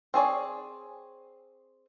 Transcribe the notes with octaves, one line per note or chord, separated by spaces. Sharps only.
C4 G#4 C#5 D5